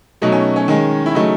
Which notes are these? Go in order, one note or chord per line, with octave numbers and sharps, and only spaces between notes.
B2 F#3 A3 D#4
C#4
C#4
D#3 G#3
E4
C#3 F#3 A3 D#4